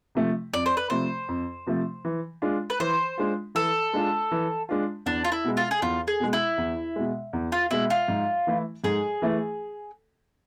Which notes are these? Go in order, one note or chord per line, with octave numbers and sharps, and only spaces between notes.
C3 F3 A3
F2 D5
C5
B4
C3 F3 A3 C5
F2
C3 F3 A3
E3
G#3 D4 F4
B4
E3 C5
G#3 D4 F4
E3 A4
G#3 D4 F4
E3
G#3 D4 F4
E2 D4
F4
E4
B2 G#3
F4
G#4
E2 F4
G#4
B2 G#3
E4
E2
B2 G#3
E2
F4
B2 G#3 E4
F4
G#2
E3 A3 E4
G#2 G#4
E3 A3 E4